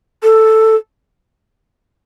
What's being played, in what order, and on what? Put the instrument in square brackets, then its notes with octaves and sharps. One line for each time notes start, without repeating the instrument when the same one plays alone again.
[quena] A4